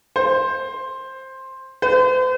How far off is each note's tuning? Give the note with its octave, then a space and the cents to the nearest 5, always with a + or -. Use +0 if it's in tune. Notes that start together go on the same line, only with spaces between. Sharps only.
C5 +10
C5 -45